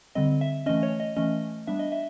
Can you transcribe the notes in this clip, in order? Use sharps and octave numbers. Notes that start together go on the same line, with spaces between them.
D3 G3 C4 D#5
E5
E3 A3 C#4 D#5
C#5
D#5
E3 A3 C#4 D#5
G3 B3 D4 E5
D#5
E5